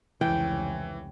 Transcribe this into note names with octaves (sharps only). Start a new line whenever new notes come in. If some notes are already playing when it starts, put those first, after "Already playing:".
F1 C#2 E3 G5